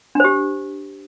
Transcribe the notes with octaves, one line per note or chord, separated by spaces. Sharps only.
D4 G4 C5